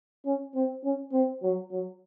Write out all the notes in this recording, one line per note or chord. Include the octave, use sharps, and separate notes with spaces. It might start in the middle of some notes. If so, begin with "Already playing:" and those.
C#4
C4
C#4
C4
F#3
F#3